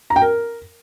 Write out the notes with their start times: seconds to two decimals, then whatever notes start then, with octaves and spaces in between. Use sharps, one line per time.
0.10 A#5
0.16 G5
0.22 A#4